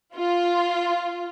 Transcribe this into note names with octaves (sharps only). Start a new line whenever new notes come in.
F4